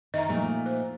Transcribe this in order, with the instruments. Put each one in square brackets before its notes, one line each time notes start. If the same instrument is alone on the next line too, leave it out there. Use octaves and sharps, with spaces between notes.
[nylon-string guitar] D#3 [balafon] D#5 E5 A#5
[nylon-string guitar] A#2 A3 D#4 [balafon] F3
[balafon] C5